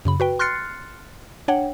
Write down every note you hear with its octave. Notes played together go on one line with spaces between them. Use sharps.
F#2 C#3 B5
F#4 B4 G5
C6 F6 F#6 A6 C7 C#7
D4 C#5 F#5 G5